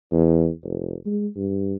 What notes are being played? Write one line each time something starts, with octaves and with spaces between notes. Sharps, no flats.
E2
F1
G#3
G2